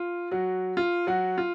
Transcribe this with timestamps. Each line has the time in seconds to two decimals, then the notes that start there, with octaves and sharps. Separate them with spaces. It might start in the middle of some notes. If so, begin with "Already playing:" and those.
Already playing: F4
0.31 F#3 F#4
0.77 F4
1.07 F#3 F#4
1.38 F4